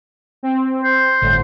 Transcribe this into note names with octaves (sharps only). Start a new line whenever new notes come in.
C4
C5
G1 A2 D3